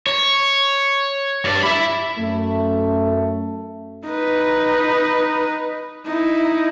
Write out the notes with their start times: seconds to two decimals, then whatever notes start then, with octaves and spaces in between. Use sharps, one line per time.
0.07 C#5
1.45 G2 D5
1.62 E5 B5
2.19 F#2 A3
4.06 D#4 B4
6.06 D#4 E4